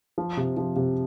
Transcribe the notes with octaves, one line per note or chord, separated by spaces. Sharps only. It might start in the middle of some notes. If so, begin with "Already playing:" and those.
F3
C3
F3
C3